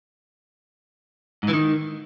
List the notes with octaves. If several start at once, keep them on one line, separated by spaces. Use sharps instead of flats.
G#2
E3
D#3